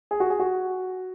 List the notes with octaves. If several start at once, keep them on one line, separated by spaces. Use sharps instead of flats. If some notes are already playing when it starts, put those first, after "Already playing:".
G#4
F#4
G#4
F#4